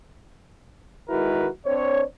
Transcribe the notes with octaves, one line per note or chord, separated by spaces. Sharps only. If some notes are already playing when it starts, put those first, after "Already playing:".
D#3 G#3 E4 F#4 A#4 B4
C4 D4 C5 C#5